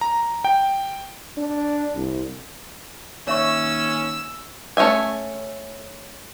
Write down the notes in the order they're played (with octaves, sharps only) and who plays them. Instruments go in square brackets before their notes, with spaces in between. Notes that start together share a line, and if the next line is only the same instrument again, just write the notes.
[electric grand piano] A#5
G5
[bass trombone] D4
C2
[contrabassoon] D#2 [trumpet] C#4 [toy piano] C#5 E5 C#6 [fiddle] E6
[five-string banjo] A3 C#4 F#4 E5 G#5